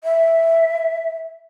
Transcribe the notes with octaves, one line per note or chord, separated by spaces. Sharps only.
E5